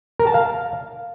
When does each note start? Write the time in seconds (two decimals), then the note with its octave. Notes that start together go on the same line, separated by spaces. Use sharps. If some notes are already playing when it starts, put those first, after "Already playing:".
0.20 A#4
0.27 A5
0.34 F5